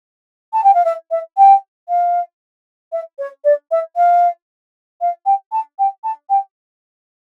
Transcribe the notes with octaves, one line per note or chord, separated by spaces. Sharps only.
A5
G5
F5
E5
E5
G5
F5
E5
C#5
D5
E5
F5
F5
G5
A5
G5
A5
G5